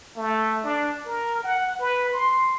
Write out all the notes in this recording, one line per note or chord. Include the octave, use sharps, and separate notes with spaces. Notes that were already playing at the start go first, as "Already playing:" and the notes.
A3
D4
A#4
F#5
B4
C6